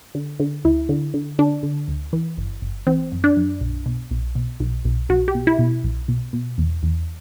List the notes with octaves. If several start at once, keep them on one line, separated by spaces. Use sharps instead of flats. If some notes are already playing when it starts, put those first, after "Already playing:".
D3
D3
D2 E4
D3
D3
D3 D4
D3
D2
E3
G1
G1
E3 C4
F#2
D4
F#2
B1
B2
B1
B2
B1
B1
B1 F#4
G4
B2
E4
B2
B1
B2
B2
E2
E2